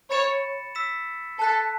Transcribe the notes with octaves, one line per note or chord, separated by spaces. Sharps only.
C#5 B5 A6 C#7 E7
E6 B6 E7
A4 A5 F#6 B6